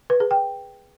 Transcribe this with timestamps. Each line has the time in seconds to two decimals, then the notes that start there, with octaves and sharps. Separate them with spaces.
0.10 B4
0.20 G#4
0.31 G5